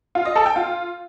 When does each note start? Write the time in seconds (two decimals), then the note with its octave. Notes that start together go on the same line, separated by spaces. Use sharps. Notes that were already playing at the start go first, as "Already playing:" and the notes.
0.15 F4
0.25 D#5
0.36 A4
0.46 G5
0.56 F4